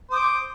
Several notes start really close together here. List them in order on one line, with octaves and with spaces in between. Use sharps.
C5 D#6 D6